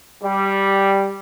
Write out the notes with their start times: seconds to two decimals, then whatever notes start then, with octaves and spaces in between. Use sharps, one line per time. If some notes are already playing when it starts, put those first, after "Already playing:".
0.22 G3